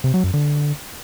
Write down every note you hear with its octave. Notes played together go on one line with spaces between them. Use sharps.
C3
F#3
F#2
D3